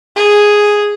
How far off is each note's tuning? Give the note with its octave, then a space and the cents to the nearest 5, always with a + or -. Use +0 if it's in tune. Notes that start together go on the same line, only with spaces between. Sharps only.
G#4 +0